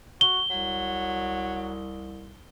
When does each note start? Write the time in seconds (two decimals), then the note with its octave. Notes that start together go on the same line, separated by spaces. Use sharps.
0.21 F#4 G7
0.50 C2 F#3